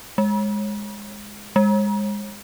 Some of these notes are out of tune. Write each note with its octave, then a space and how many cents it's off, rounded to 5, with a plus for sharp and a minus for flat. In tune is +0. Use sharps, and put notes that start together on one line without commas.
G#3 -5
G#3 -20